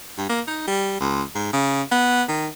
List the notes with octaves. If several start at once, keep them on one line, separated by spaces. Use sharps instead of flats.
G2
A#3
D#4
G3
C#2
G#2
C#3
B3
D#3